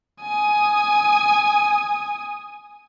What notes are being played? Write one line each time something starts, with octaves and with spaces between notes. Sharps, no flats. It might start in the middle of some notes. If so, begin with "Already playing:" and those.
G#5 D#6